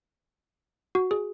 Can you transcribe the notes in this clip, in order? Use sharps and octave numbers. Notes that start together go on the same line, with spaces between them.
F#4
G#4